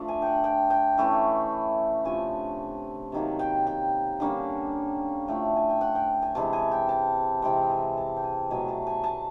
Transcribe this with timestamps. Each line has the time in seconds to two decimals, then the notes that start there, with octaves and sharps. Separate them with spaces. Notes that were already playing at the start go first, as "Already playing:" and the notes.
Already playing: F3 A3 D4
0.08 G#5
0.22 F#5 G5
0.44 G5
0.70 G5
0.98 E3 A3 C#4 E4
2.04 C3 F3 A3 D4 G#5
3.12 C3 D#3 F#3 A#3
3.39 G5
3.67 G5
4.20 D3 G3 A#3 C#4
5.27 A2 F3 A3 D4 G5
5.56 G#5
5.70 G5
5.81 F#5
5.95 G5
6.22 G#5
6.35 C3 E3 G#3 A5
6.53 G#5
6.71 G5
6.89 A5
7.42 C3 E3 G#3 C4 G5
7.70 G#5
7.97 A5
8.17 G5
8.23 G#5
8.50 B2 F#3 A3 G#5
8.68 A5
8.87 G#5
9.04 A5